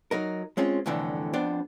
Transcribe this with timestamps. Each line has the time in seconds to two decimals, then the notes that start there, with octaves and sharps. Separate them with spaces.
0.11 F#3 D#4 A#4
0.57 G#3 C4 C#4 F4
0.86 C2 F2 A2 D3 E3
1.34 F2 B3 D4 C5 G5